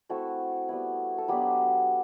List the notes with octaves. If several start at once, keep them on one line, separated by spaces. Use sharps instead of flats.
A3 C4 E4 F#4 A4
G3 B3 E4
A4
F#3 B3 D4 G4 B4